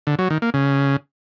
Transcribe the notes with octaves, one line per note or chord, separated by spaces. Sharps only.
D3
F#3
D#3
A#3
C#3